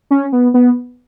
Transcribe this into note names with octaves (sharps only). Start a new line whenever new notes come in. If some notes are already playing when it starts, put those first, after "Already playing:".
C#4
B3
B3